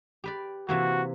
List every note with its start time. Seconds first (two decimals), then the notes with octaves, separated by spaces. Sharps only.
0.24 G4 B4 D5
0.69 C3 E3 A#3 F#4